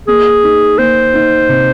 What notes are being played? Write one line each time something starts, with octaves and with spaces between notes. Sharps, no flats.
A#3 G#4
D#4
A#3 C5
D#4
C3